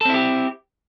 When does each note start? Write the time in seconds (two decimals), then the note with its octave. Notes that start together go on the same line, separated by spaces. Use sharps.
0.01 A4
0.05 C4
0.10 E4
0.14 G4